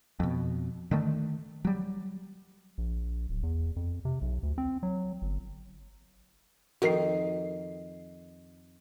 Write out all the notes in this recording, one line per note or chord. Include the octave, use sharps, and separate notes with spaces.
F2 B2
D3 D#3 A3
F#3 G3
A#1
D1
E2
F2
C3
B1
D2
C4
F#3
G1
F2 D#3 F#4 A#4 C7